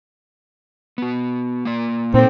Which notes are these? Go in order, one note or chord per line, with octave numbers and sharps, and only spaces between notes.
B3 F#4
A#3 F4 D5
A#2 C4 D#4 A4